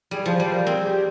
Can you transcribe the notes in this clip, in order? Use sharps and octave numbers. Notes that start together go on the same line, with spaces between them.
G3 G#4
F3 C5
G3 C5
A#4
C4 G#4
G4